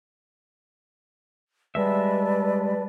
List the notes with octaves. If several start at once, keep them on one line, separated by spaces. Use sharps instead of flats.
G3 G#3 B4 D5 E5 A5